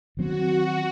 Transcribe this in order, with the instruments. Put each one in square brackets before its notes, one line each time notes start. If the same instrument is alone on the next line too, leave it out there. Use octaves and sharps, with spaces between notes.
[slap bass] D#3 F#3 C4 [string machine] F#4